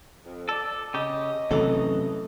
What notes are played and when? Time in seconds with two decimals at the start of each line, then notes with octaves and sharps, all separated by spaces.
0.24 F2
0.49 A4 D5
0.94 C#3 G4 D#5
1.51 F#2 C3 E3 F#3 A3 C#4 A4